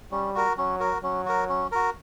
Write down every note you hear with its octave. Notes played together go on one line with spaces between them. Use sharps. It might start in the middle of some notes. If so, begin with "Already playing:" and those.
G3 C#4
F#4 A#4
F#3 C#4
F#4 A#4
F#3 C#4
F#4 A#4
C#4
F#4 A#4